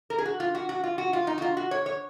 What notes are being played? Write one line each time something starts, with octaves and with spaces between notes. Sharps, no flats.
A#4
G#4
F#4
F4
F#4
F#4
F4
F#4
F4
D#4
F#4
F4
F#4
C#5
C#5